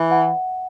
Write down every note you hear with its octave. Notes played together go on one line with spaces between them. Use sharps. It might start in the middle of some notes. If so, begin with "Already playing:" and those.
Already playing: E3 E5
F#5